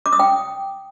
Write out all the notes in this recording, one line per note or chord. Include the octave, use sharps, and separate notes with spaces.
D6
D#6
G5